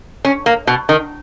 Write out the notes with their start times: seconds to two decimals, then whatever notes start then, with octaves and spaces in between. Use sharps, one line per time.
0.25 C#4
0.46 A#3
0.67 B2
0.89 D#3